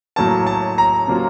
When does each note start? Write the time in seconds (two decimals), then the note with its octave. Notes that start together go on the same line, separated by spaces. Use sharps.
0.16 A2 F#3 A#3 A5
0.47 A5
0.78 A#5
1.08 C3 F#3 A#3 C#4 F4